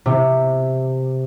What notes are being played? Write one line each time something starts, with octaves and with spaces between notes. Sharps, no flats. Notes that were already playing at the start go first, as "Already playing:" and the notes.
C3